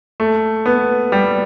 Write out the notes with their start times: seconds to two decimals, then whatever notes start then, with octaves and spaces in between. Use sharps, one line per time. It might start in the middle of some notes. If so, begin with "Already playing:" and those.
0.20 A3
0.66 B3
1.12 G3